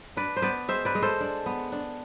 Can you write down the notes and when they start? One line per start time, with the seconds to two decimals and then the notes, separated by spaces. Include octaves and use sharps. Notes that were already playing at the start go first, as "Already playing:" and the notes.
0.16 D4 B4 D5
0.36 C5
0.42 B3 B4 D5
0.68 G#3 C5 E5
0.85 B4 D5
0.95 G#3
1.02 A4 C5
1.21 D4
1.46 B3
1.72 D4